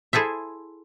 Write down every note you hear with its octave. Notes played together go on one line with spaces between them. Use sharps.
E4 G#4 A4 C5 E5